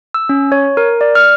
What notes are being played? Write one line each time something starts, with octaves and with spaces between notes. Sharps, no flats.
E6
C#4
C#5
A#4
D5
F6